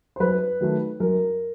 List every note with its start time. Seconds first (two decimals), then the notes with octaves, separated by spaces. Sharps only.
0.16 C5
0.20 F#2 B4
0.61 D#3 F#3 A3
1.00 F#2 A#4